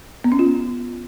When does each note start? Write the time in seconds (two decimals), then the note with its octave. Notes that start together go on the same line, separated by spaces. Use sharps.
0.24 B3
0.32 C#4
0.39 F4